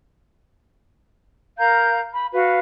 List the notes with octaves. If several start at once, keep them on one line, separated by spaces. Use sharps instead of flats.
A#4 F5 A#5 G6
B5
F#4 B4 F5